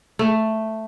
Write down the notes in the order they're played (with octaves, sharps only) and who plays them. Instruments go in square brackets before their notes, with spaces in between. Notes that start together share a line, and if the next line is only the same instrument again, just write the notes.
[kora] A3